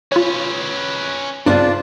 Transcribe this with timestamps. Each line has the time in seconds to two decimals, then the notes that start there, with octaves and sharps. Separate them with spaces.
0.12 C#4 F4 B4 C#5
1.46 G2 C#3 C4 D4 F4 D5